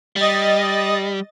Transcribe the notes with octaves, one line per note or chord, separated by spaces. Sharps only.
G3 D#5 A6